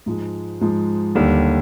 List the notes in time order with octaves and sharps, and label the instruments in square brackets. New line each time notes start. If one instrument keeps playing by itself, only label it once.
[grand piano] G#2 F3 G#3
G#2 F3 G#3
D#2 D3 G3